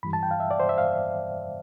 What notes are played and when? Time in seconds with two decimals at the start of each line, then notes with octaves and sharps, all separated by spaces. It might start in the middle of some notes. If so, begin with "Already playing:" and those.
0.03 G2 E3 G3 B5
0.13 A5
0.23 G5
0.31 F5
0.40 E5
0.51 D5
0.60 C5
0.69 E5
0.78 F5